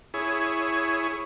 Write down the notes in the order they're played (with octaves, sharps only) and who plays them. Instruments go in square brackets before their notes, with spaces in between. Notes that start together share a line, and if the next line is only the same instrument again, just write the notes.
[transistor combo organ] E4 G#4 C#5